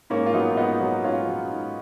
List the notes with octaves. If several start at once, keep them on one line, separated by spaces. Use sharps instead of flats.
G#2 A#3 C#4
F4
F#3 B3 D#4
F4
G#2 B3 D#4
F#3
G#2 C#4 F4
F#3
G#2